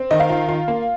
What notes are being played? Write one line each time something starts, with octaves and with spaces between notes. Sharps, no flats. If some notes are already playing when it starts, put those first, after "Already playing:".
Already playing: C4
D#3 D#5
F5
F4
F4
A#3